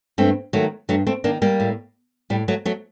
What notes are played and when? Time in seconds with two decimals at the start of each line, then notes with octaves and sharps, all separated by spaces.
0.18 G2 A3 C4
0.53 D#3 F#3 A3
0.89 G2 F#3 A3
1.07 A3 C4
1.24 D#3 A#3 D4
1.42 G3 A#3
1.60 A2
2.30 A2 G3
2.48 F#3 A3
2.65 F#3 A3